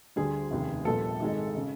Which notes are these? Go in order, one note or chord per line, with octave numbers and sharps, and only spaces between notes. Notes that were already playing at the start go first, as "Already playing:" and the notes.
D2 D3 G3 G#4
F1 D#2 C#3
A#1 A#2 G3 B3 A4
G#1 G#2 D#3 G#3
C#3